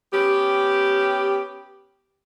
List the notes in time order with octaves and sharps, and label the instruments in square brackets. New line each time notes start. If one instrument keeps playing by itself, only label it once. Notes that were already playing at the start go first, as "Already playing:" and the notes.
[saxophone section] B3 C#4 G4